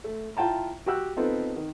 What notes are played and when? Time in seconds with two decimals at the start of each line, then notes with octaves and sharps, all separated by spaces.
0.04 A3
0.37 E4 F4 G5 A5 A#5
0.86 F#4 G4 G5 E6 F#6
1.17 B3 C4 D#4 F4 A4 B4
1.56 D#3